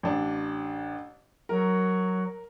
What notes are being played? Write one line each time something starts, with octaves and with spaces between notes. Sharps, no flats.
A1 D4
F#3 A#4